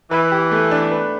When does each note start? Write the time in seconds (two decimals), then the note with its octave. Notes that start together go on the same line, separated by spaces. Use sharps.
0.10 E3 B4
0.32 G4
0.51 A3
0.71 D4
0.92 B4